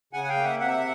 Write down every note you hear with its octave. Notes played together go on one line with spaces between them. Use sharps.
C#3 F#5 G#5
F#5
F5 G5
A#3
E5 F#5
C3 E5 F#5